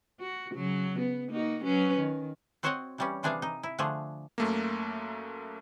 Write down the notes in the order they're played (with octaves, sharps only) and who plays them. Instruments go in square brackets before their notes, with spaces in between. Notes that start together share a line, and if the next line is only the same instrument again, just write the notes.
[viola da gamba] F#4
C#3 F#3
B3
A#3 D#4 F#4
F#3 C#4 B4
D#3
[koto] C4 F#4 C5 C#5 D#5 F#5
E3 G3 C#4
C3 E3 D4 G#4 A4 F5
D#4
E4
D3 F3 A3 D4 G#4
[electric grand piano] F#2 A3 A#3